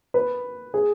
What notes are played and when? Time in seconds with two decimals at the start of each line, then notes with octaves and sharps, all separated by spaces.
0.14 B4
0.74 G#4